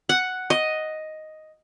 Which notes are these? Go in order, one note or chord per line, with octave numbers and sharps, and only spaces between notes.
F#5
D#5